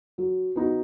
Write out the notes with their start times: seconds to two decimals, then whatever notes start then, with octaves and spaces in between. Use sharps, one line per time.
0.18 F#3
0.56 B3 D#4 F#4